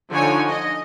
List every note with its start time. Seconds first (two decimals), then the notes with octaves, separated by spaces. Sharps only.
0.12 D3 F3 D#4 C#5 G#5
0.48 D#5